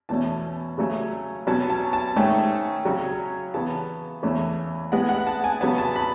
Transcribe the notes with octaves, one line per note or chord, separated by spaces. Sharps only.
E2 B2 A3 C#4 A5
C#3 F#3 A3 C#4
B2 F#3 C#4 A5
A5
A5
G#2 D#3 A3 C#4
C#3 F#3 C#4
C#3 E3 B3 A5
E2 C#3 E3 A3 C#4
A2 G#3 B3 F#5
F#5
A5
G#5
C#3 F#3 B3 A5
A5
B5